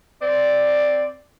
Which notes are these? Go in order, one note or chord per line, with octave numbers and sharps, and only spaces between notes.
C4 D5